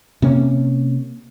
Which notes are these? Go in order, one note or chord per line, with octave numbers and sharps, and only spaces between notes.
C3 A#3 C#4